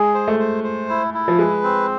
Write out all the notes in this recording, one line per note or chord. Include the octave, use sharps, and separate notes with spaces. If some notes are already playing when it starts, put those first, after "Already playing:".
Already playing: G#3 G#4
C5
A3
C5
C5
E4
E4
F3
G#3 B4
C4